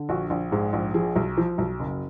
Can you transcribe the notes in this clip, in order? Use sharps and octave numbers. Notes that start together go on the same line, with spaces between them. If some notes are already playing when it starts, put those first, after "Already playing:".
Already playing: D3
A#1 F#4
A#1
G#2 G#4
A#1
F3 G#4
B1
F3
B1
F#1